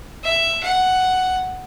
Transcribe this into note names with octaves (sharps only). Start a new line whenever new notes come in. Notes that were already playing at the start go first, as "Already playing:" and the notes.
E5
F#5